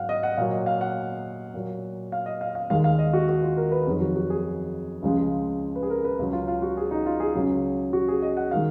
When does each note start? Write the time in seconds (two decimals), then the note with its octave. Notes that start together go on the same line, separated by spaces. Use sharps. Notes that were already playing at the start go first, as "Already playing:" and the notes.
Already playing: G#2 F#3 F5 F#5
0.09 D#5
0.23 F#5
0.37 A#2 F#3 F5
0.52 D#5
0.66 F5
0.81 F#5
1.54 A#2 F#3
2.12 F5
2.26 D#5
2.41 F5
2.55 F5
2.70 D#2 D#3 G#3 F5
2.84 F5
2.99 D#5
3.13 F#4
3.29 F#4
3.42 F4
3.57 A#4
3.72 B4
3.86 F2 D#3 F#3 G#4
4.00 F#4
4.16 F#4
4.30 G#4
5.02 C#2 C#3 F3 G#3
5.76 B4
5.83 G#4
5.90 A#4
6.05 B4
6.19 C#2 C#3 F#3
6.33 F4
6.48 F4
6.62 F#4
6.77 G#4
6.91 D#4
7.06 F4
7.20 G#4
7.35 C#2 C#3 F#3
7.93 F#4
8.08 G#4
8.22 D#5
8.37 F#5
8.51 D#3 G#3 F5